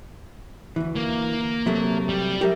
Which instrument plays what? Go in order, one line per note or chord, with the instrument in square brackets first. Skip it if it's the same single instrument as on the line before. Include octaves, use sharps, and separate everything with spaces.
[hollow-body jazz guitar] D2 E3
[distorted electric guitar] A#3
[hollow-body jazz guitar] C3 F#3 A3
[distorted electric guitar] G3
[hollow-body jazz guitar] G4 A#4 E5